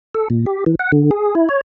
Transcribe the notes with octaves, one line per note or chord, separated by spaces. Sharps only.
A4
A#2
G4
E3
F#5
D3
G#4
E4
C#5